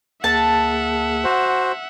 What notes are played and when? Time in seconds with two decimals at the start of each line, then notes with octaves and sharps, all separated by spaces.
0.24 D2 A#3 G#4 E5 F#5 A5
1.24 F#4 C5